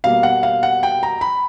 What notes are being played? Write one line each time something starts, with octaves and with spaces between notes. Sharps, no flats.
B2 G3 A#3 F5
F#5
F5
F#5
G5
A#5
B5